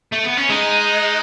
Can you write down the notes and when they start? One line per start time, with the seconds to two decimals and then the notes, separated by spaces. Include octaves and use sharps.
0.12 A3
0.24 B3
0.37 C#4
0.50 G#3 D#4